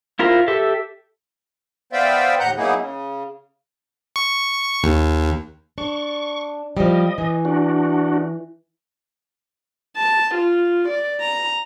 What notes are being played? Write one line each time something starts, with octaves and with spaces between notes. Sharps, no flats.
E4 F4 A#4 C5 A#5
G4 A4 E5
B3 C5 D5 E5 F5 G5
D#2 A2 F#5 A#5 F#6 G6
F#3 A#3 B3 D#4 E4 G#4
C#3
C#6
D#2
D4 C#6
F3 G3 D#5
E3
D4 F#4
A5
F4
D5
A#5